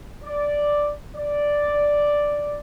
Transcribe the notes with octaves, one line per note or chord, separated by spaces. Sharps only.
D5
D5